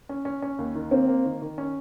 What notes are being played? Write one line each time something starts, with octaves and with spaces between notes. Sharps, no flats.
C#4
C#4
C#4
D#2
D#3
A#3 C4
A#3
D#3
D#3
C#4